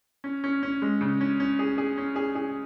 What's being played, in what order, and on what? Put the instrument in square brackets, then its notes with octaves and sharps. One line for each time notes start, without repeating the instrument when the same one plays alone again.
[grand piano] C#4
C#4
C#4
G#3
C#3
C#4
C#4
G#4
G#4
C#4
G#4
G#4